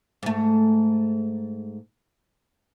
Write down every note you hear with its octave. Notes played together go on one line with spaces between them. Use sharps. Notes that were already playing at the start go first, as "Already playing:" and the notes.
G#2 A3